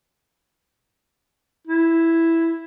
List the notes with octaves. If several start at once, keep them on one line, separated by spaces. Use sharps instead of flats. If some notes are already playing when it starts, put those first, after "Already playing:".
E4